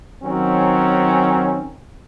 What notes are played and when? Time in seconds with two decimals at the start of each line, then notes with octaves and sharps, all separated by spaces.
0.23 D#3 F#3 C4 C#4